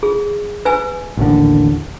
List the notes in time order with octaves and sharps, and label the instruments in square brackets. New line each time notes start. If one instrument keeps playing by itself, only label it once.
[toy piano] G#4
B4 G#5 E6
[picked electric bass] A1 D#2 D3